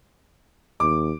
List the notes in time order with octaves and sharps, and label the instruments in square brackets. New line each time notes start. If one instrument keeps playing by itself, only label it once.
[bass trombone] D#2 [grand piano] D6